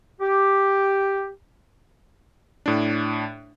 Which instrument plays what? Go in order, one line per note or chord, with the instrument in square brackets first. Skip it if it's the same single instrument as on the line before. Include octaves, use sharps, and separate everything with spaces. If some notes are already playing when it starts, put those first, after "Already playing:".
[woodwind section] G4
[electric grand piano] A2 D4